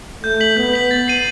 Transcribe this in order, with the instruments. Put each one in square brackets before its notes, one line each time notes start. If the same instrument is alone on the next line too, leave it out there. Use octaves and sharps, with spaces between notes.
[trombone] A3 [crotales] G6
[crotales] B6 F#7
[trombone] B3 [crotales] G6
[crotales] B6 F#7
A6
C7 D#7 F#7